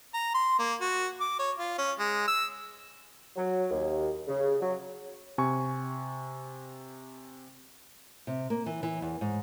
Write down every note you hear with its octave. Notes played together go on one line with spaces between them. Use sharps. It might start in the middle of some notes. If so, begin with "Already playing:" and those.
A#5
C6
A#3
F#4
D6
C#5
F4
C#4
G#3
E6
F#3
D#2
C#3
F#3
C3 G#5 C#6
C3
A#3
E3
E3
E2
G#2